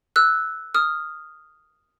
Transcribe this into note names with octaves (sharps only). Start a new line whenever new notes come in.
E6 F#6
D#6 F6